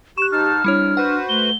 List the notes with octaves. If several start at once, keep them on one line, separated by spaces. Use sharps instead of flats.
G4 C#6 F#6 E7
G#2 D#4 A5 F6
C3 G3 D4 E4 C#5
F#4 B4 C5 F#5
A3 G7